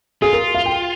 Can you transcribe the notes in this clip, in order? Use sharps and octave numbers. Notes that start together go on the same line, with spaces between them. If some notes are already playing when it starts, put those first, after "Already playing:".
F4 G#4
A#4
F5
G5